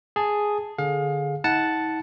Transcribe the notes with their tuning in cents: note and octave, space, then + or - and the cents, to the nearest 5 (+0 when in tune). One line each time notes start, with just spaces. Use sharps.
G#4 +0 A5 +0
D3 +0 G#4 +0 F5 +30
D#4 +45 F#5 +0 A5 -5